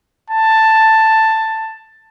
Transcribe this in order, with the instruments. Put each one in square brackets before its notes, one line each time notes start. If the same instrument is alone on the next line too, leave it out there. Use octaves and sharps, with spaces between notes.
[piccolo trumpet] A5